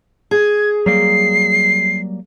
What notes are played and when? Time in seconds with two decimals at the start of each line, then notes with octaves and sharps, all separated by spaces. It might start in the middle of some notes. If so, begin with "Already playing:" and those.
0.31 G#4 G#6
0.86 F#3 G3 A#3 C7